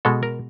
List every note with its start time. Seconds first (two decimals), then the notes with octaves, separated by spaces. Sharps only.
0.05 B2 G#3 A4
0.23 A#4